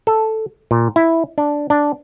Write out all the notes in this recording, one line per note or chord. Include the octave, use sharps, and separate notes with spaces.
A4
A#2
E4
D4
D4